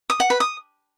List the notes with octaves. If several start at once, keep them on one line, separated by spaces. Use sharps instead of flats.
D#6
F#5
B4
D#6